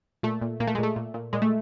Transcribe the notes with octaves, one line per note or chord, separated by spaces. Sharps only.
A#2 A3
A#2
A#2 A#3
A3
G#3
A#2 A3
A#2
A#2
A#2 G#3
A3